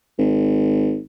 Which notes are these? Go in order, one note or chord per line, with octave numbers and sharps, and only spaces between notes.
G#1